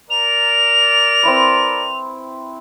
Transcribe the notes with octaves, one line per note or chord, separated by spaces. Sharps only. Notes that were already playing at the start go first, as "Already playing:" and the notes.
A#4 D5 F7
C4 E4 B4